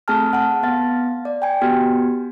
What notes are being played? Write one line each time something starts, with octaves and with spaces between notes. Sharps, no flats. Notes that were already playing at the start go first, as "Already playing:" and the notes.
A3 C4 G#4 G#5 A5 F6
F#5 A5
B3 F5 A6
D5
G5 G#5
B3 F#4 G4